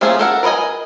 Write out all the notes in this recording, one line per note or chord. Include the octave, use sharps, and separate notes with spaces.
F3 A3 A#3 C#4 G#4
A4 A#4 F#5
A#4 B4 C#5 D#5 G#5